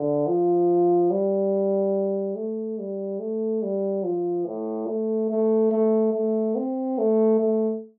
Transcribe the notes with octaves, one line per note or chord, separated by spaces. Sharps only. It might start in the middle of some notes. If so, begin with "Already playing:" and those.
Already playing: D3
F3
G3
A3
G3
A3
G3
F3
A2
A3
A3
A3
A3
C4
A3
A3